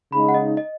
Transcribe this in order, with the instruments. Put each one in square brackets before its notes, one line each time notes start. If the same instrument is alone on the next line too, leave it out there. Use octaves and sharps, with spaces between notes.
[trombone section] C#3 G#3 D#4 [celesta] B5
[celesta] F#5
D#5
D#5